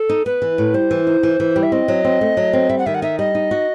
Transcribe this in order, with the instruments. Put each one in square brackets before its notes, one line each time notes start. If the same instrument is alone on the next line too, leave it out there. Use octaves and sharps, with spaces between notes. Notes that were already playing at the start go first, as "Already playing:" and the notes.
Already playing: [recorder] A4
[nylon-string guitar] D#4
[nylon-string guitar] B3 [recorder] B4
[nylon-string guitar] E3
A2
[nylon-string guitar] G3 [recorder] C5
[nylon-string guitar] E3
D#4
E3
E3
G3
[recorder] E5
[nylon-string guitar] C4 [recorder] D#5
[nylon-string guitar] F#3
C4
A3
F#3
C4
[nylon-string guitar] G3 [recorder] E5
[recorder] F#5
[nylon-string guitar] D#3 [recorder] E5
[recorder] F#5
[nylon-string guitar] D#4 [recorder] E5
[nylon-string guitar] G3 [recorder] D#5
[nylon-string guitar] D#4
F#4